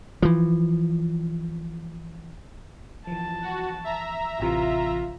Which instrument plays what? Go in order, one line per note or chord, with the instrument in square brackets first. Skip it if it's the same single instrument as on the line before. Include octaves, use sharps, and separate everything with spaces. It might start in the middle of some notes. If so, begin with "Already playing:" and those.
[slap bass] E3 F3
[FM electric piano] E3 F3 [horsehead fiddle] A5
[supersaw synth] F#4
E5 A#5
[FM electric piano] A1 C3 E3 [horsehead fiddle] F4